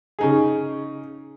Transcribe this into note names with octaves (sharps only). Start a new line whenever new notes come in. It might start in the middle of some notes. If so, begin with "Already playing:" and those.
C#3 D#4 G#4